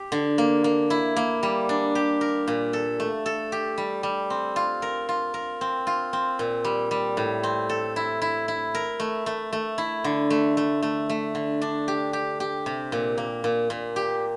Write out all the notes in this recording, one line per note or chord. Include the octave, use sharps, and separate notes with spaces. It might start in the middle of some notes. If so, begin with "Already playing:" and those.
Already playing: G4
D3
A#3
A#3
E4
A#3
G3
D4
G4
A#4
A#2
A4
A3
A4
G4
G3
G3
C4
F4
A#4
F4
A#4
C4
F4
C4
A#2
G3
G3
A2
C4
A4
E4
E4
E4
A#4
A3
A3
A3
E4
D3
A3
A3
A3
A3
D3
D4
G4
G4
G4
C3
A#2
A#3
A#2
A#2
G4